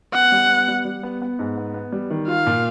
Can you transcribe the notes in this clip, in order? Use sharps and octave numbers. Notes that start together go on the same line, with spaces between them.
B3 F#5
G3
B3
G3
G3
B3
B3
G#2
B3
B3
G3
D#3
F4 F5
A#2